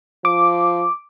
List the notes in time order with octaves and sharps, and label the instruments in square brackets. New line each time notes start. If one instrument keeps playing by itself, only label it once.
[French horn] F3 [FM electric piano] D6